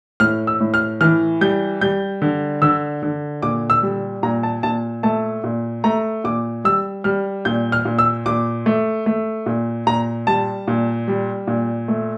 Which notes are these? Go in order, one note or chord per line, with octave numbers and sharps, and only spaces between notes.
A2 F6
E6
A2
F6
E3 F6
G3 G6
G3 G6
D3
D3 E6
D3
A#2 D6
E6
G3
A#2 A#5
A5
A#2 A5
A3 A5
A#2
A3 A#5
A#2 D6
G3 E6
G3 F6
A#2 G6
F6
A#2
E6
A#2 D6
A3
A3
A#2
A#2 A#5
G3 A5
A#2
G3
A#2
A3